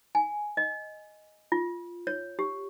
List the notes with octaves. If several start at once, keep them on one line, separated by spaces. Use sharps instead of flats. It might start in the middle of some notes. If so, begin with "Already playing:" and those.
G#5
D#5
F4
C#5
G4